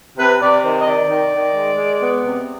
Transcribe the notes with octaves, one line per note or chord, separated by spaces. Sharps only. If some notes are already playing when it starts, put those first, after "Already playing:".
C3 B4
C3 D5
D#3 C5
D#5
D#3 D5
D#3
D#3
G#3
G#3
B3
C3